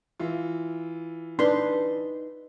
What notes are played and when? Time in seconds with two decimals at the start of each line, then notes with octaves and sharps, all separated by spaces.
0.19 E3 F4
1.39 D4 D#4 B4 C6